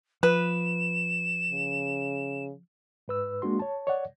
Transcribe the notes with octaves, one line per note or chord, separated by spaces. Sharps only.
F3 B4 E7
C#3
G#2 B4 E6
G#3 A#3 D4 F#4 C6
C#5 A5
C#5 D5 F#5